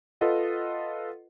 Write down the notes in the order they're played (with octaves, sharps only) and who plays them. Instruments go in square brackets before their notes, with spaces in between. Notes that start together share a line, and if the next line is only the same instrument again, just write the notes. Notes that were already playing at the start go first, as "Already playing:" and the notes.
[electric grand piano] F4 A4 B4 D#5 F#5